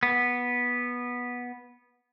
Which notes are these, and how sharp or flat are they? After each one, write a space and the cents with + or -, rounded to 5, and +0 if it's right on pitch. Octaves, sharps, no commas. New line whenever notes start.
B3 -10